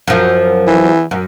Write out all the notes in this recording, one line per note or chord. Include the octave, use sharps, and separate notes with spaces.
F#2 F3
E3
F#2